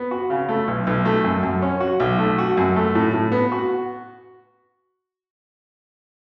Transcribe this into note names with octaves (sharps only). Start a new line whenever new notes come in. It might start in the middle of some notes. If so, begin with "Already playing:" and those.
Already playing: B3
F#4
C#3
A3
B1
B1
A3
F#2
F#2
C#4
F#4
B1
A3
F#4
F#2
A3
A2
A2
B3
F#4